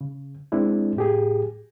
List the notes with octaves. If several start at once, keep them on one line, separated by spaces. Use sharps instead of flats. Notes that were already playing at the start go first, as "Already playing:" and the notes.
C#3
G#3 C4 D4 E4
A2 G4 G#4